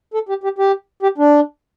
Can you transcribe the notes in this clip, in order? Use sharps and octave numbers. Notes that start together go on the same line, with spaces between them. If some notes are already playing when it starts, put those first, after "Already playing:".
A4
G4
G4
G4
G4
D4